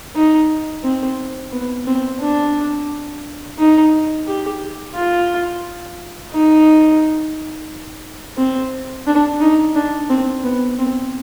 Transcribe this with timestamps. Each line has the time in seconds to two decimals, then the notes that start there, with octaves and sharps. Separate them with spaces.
0.16 D#4
0.84 C4
1.52 B3
1.87 C4
2.21 D4
3.59 D#4
4.27 G4
4.95 F4
6.32 D#4
8.38 C4
9.07 D4
9.41 D#4
9.75 D4
10.10 C4
10.44 B3
10.79 C4